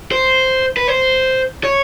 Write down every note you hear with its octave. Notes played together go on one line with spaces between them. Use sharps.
C5
B4
C5
C#5